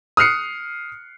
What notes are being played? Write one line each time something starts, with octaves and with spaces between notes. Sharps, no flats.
D#6 F6 F#6 C7 C#7